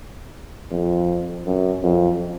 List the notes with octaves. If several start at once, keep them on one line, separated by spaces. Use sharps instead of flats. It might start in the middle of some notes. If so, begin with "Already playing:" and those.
F2
F#2
F2